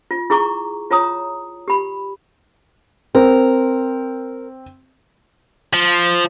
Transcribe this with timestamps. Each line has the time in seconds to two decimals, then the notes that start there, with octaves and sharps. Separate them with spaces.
0.11 F4
0.30 E4 G#4 A#5 C#6 D6
0.91 F4 C#5 A#5 D#6
1.68 G4 B5
3.15 C4 A#4
5.73 F3